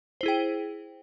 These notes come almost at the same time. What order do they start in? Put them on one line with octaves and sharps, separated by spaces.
C5 E4 G#4 G5